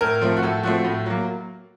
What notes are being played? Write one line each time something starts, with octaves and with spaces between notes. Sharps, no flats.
A2 A#4
F3 A3 C4
F#4
A2 A4
F3 A3 C4 F#4
A2
F#3 A#3